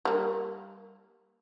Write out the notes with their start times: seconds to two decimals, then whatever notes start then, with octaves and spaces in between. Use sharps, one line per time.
0.05 G3 A#3